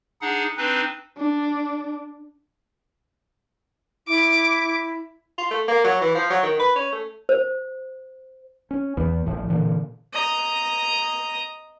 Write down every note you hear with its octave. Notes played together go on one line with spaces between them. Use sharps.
D4 D#4 G#4 F#5
C4 D4 D#4 B4
D4
E4 D6
F4
A3
A#3
F#3
E3
F3
F#3
D#3
B4
C#4
A3
C5
C#4
E2 B3
A#1 A2 F3
A#2 D3 E3
D#5 A#5